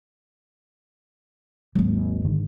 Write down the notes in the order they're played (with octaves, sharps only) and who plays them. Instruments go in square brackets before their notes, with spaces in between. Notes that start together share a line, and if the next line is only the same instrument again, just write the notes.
[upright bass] G#1 D#2 [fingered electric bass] F#3
[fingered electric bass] G#2 D3 D#3